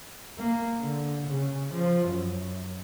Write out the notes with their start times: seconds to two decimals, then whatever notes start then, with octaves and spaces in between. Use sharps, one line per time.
0.39 A#3
0.80 D3
1.28 C#3
1.74 F3
2.09 F#2